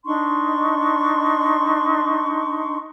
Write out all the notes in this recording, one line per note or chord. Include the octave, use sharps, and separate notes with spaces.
D4 D#4 C6 C#6